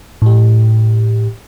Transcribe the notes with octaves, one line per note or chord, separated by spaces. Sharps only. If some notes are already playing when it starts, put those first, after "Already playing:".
A2 G4